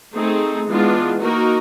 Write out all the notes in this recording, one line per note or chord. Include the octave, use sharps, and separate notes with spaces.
A3 C4 D#4 G#4
E3 G#3 B3 D4 F4
A#3 D#4 F#4 A#4